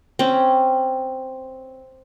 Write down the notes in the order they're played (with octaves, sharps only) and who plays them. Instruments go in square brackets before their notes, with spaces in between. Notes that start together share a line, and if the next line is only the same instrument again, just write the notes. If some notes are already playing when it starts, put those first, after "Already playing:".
[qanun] C4 C#4